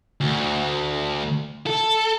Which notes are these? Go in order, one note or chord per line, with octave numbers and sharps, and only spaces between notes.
D2
A4